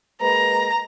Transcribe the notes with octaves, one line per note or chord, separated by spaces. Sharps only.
G#3 A#3 B4 A#5